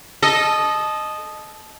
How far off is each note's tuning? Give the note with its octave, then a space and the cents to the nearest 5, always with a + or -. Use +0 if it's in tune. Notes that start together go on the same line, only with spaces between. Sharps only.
A4 -20 D#5 -10